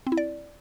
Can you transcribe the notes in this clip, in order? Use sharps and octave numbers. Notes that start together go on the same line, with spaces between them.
C4
E4
D5